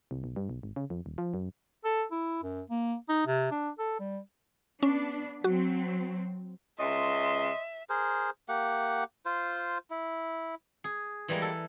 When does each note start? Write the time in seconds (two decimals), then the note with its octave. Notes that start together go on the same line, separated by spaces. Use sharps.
0.11 C2
0.24 B1
0.36 G2
0.49 B1
0.63 G#1
0.76 C#3
0.90 F2
1.06 D#1
1.18 F3
1.34 F#2
1.84 A4
2.11 E4
2.43 F#2
2.70 A#3
3.09 D#4
3.27 C3
3.51 D4
3.79 A4
3.99 G3
4.83 B3 C#4 D4
5.44 F#3 C4 F#4
6.79 C#2 D#5 E5 C6
7.90 G#4 A#4 C5
8.49 A#3 G4 F#5
9.26 F4 C5
9.90 E4
10.84 G#4
11.28 E3 G3 G#3 A#3
11.42 A4